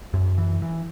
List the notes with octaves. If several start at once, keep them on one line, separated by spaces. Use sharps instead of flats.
F#2
E3
E3